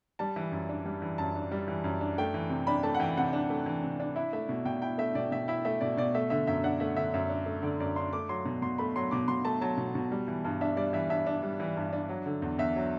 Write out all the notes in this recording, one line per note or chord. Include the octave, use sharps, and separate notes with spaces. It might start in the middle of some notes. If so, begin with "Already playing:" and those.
G3 A5
E3
F#2
D4
G3
E3
F#2 A5
D4
G3
E3
F#2
D4
A3 G5
E3
C3
D4 B5
A3 A5
F#5
E3 G5
C3 F#5
D4
A3
E3
C3
D4
E4 E5
A3 E5
B2
B2 G5
E4 G5
A3 E5
B2 D5
B2 E5
E4 E5
A3 E5
B2 D5
B2 D5
A3 E5
D3 E5
F#2 E5
D4 F#5
A3 E5
D3 E5
F#2 E5
D4
A3
D3 D5
F#2 D5
D4 C6
A3 D6
F#3 C6
B2
B2 C6
A3 B5
F#3 C6
B2 D6
B2 C6
A3 A5
F#3 A5
B2
B2
G3
E3
G2
D4 E5
G3 D5
E3 E5
G2 E5
D4
G3
E3
G2
D4
F#3
D3
E2
E2 E5
F#3